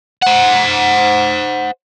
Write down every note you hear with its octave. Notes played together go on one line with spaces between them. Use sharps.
C5 F#5